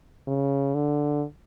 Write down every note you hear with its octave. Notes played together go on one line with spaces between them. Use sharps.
C#3
D3